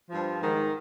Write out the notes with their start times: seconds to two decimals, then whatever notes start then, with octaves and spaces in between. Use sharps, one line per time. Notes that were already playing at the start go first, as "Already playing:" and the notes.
0.10 G2 F3
0.41 G#2 D#3